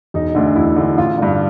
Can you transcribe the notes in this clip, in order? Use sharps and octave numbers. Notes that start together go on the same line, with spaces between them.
E1 D#4
D2 D3
E1 E4
D2 D3
A1 F4
G2 D3